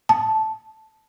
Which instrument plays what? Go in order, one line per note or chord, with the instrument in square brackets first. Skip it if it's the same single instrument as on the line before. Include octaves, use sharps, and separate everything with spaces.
[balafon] A5